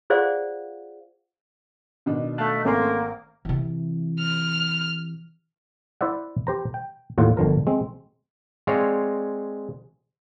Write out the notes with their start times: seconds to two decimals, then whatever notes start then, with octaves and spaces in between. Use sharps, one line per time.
0.10 F4 G#4 C5 D5 F5 F#5
2.06 B2 D#3 D4
2.38 A3 F5 A5 F#6
2.65 G#1 A3 A#3 C#4 C6
3.45 C3 E3
4.19 F6
6.01 E4 C5 D5 E5 F#5
6.47 G4 C5 A#5
6.74 G5
7.18 D#2 A2 F4 F#5
7.37 G1 D3 F3 A#4
7.67 G#3 C4
8.67 G#3 C4 C#5 D5 F5